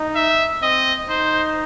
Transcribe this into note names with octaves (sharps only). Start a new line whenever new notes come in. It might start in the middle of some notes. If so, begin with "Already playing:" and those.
Already playing: D#4
E5
C4 D#5
D#4 C5